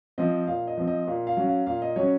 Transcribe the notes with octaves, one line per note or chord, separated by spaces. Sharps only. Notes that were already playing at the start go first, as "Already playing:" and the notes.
F3 C4 D#5
A#2 F5
D#5
F3 C4
D#5
A#2 F5
F5
F#3 C#4
F5
A#2 F5
D#5
F#3 C#4 C#5